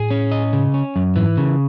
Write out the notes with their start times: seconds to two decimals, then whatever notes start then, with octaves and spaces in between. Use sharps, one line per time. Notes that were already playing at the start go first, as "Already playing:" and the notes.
Already playing: A2 G#4
0.11 C#4
0.31 D#5
0.53 C#3
0.74 C#4
0.96 F#2
1.16 G#2 E3
1.37 C#3